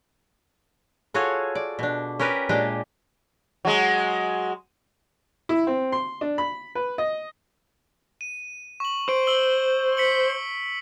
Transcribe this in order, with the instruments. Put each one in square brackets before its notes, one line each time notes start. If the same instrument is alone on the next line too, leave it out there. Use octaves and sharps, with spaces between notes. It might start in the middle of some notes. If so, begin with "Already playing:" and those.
[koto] F4 F#4 G#4 A4 C#5 F5
D5
B2 D4
C#4 G4 A#4 B4
A#2 G#3 D4 G4
[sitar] F#3 G#3
[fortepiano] E4
C4
C6
D4
B5
B4
D#5
[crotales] D#7
C#6 F#7
[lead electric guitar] C5 [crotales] D7
[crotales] E6 F#7 G7
B6 C#7 F#7